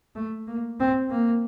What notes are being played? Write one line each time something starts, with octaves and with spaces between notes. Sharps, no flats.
A3
A#3
C4
A#3